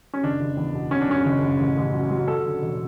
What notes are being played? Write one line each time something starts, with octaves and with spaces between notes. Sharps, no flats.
C#4
F#1 D4
F#1
E2
B2
D3 C#4
D4
F#2 C#4
F#1
F#1
A1
A1
F#3
F#3
F#3 A4
D3
E1